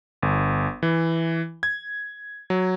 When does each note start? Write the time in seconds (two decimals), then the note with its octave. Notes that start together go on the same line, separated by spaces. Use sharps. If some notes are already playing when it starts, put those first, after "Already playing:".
0.22 G1
0.83 E3
1.63 G#6
2.50 F#3